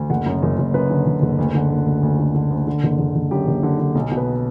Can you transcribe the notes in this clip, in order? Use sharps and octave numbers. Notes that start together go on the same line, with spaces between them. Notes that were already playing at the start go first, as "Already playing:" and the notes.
Already playing: D2
F#1 F#5
F#2
F#1
F#1
F#2 B4
D3
F#1
F#1
D2
D3
D2
D2
D2
D3
D3
D2
D3
F#1
F#1
F#1
F#2 G4
F#1
D3
D3
B1
B2
B4